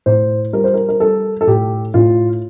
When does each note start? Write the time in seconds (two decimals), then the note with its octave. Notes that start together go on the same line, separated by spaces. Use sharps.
0.06 A2 C5
0.53 G3 A#4
0.64 C5
0.74 A#4
0.89 A#4
1.00 G3 A4
1.41 A4
1.47 A2 G4
1.94 A2 F4